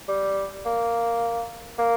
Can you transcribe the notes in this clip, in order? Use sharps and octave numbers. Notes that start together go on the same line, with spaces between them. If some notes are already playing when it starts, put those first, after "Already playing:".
G3
A#3
A#3